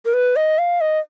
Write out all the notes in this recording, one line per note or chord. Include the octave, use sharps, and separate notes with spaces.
A#4
B4
D#5
F5
D#5